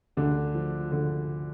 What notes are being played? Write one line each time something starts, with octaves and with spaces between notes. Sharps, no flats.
D2 D3 D4
F3
D3